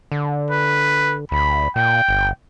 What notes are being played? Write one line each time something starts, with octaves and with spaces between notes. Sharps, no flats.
D3
B4
D2 B5
A#2 G5
G1